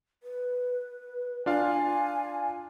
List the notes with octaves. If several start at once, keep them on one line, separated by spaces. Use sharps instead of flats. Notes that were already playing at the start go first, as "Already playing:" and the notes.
B4
D4 F4 F5 G#5